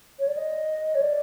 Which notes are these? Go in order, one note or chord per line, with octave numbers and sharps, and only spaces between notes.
C#5
D5
D#5
C#5
D5